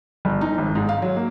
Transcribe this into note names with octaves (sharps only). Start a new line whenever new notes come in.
G1
D#4
G#1
G#2
F5
F#3
A#3